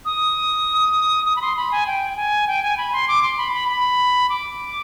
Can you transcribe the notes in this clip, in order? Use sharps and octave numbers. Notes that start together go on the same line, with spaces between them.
D#6
D#6
B5
C6
B5
G#5
G5
G#5
G5
G#5
B5
C6
D6
C6
B5
B5
B5
D6